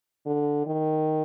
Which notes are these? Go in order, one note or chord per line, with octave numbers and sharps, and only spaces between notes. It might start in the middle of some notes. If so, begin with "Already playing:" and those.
D3
D#3